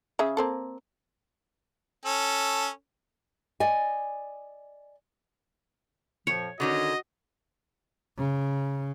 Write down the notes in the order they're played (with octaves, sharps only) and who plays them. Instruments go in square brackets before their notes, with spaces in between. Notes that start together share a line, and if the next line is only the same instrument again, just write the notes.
[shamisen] C#3 G#4 E5
A#3 C4 A4
[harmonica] C#4 A4
[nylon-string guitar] D5 D#5 G#5
[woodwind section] F2 A#2 F3 [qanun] C#5
[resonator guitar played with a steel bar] D3 D#3 C#4 [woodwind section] F#4 [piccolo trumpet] D#5
[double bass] C#3